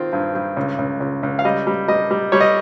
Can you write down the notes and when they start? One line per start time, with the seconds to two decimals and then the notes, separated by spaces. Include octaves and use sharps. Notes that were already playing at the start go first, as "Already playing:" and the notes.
Already playing: D#3 C4 F4
0.13 G2
0.35 G2
0.57 C#2
0.79 C#2
1.00 C#2
1.23 C#2
1.39 F5
1.45 G3 D#5
1.67 G3
1.88 G3 D#5
2.11 G3
2.32 G3 C#5
2.40 D#5